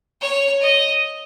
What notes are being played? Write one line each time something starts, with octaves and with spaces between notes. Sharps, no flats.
C#5
D#5